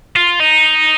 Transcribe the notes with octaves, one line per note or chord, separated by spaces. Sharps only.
F4
D#4